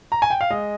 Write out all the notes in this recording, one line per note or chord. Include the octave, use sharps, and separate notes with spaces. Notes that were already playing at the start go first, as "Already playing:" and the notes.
A#5
G#5
G5
F5
G#3 D#5